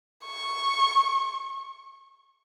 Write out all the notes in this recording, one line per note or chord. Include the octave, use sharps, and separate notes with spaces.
C#6